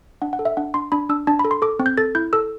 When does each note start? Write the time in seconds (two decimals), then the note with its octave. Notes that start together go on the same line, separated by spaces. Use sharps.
0.22 D4 F#5
0.33 F#5
0.39 A4
0.45 E5
0.57 D4 F#5
0.74 D4 C6
0.92 D4 B5
1.09 D4 E6
1.27 D4 A5
1.39 B5
1.45 A4
1.51 C6
1.62 A4 D6
1.79 C4
1.86 G6
1.97 A4 A6
2.15 E4 G6
2.33 A4 E6